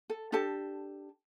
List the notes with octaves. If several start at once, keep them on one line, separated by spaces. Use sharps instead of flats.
A4
D4 G4 A4 A5